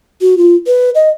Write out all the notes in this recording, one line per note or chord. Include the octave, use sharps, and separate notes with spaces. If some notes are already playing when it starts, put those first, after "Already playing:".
F#4
F4
B4
D#5